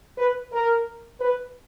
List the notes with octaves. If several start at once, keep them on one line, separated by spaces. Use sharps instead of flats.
B4
A#4
B4